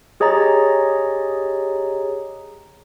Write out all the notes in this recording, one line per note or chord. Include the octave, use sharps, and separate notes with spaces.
G4 G#4 C#5 D#5 A#5 A6